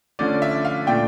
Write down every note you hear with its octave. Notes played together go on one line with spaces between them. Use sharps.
D3 F3 A3 C#4 D5
E5
F5
A#2 A3 D4 G5